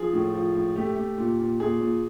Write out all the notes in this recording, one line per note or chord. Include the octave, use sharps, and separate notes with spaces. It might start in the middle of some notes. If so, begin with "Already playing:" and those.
Already playing: F3 G#4
A2
F3
A2
A3 G4
A3
A#2
A#2
A#2 G#4
A#2